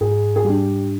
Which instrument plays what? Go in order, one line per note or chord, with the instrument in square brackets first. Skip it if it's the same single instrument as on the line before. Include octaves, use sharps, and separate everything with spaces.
[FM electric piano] G#2 [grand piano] G#4
[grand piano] G#4
[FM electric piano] G3 D4 [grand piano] G4